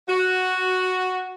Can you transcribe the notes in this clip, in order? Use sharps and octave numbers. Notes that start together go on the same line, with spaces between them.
F#4